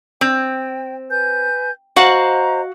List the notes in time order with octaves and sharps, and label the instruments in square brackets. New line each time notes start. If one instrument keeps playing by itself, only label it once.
[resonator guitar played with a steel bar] C4 [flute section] G5
[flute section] B4 G#5 G6
[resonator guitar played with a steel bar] F#4 F5 F#5 [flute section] C5 D#5 A#5